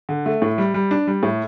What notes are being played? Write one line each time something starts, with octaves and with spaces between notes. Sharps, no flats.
D3
A3
A2
G3
G3
D4
G3
A2